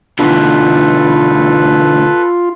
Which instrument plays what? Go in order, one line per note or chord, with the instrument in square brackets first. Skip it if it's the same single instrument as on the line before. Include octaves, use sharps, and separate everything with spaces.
[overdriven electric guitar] D2 B2 [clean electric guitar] D3 E3 [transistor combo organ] F4 [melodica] A4 B4